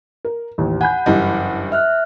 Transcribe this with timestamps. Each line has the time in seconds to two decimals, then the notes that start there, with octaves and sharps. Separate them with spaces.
0.25 A#4
0.58 A1 D#2
0.81 F#5 G#5 B5 G6
1.06 F#1 G2 E3 G4 D#5
1.72 E5 F6 F#6